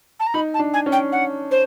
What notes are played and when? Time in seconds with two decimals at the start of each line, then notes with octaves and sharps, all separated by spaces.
0.19 A5
0.26 A#5
0.34 D#4 B5
0.54 A5
0.59 D4
0.73 G#5
0.86 C#4
0.92 G5
1.12 F#5
1.51 C5